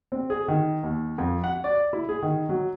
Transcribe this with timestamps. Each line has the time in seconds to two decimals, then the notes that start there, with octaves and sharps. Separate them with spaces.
0.12 C4
0.30 G#4
0.48 D#3
0.83 D#2
1.18 F2
1.44 F#5
1.64 D5
1.93 E4
2.09 G#4
2.23 D#3
2.49 F#3